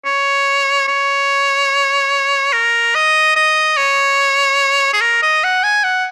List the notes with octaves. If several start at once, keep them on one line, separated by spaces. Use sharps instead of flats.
C#5
C#5
A#4
D#5
D#5
C#5
G#4
A#4
D#5
F#5
G#5
F#5